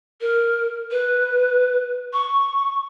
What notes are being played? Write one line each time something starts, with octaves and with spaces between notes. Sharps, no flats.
A#4
B4
C#6